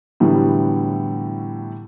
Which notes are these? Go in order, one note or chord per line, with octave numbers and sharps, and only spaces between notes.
A2 D3 E3 F#3 G3 B3